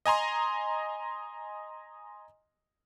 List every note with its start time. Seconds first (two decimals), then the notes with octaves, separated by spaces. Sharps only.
0.06 D#5 G#5 A#5 C6